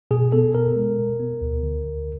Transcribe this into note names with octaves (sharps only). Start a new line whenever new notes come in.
B2 G#4
B3 A4
B2 A#4
G#3
B2
B3
D2
D3
D2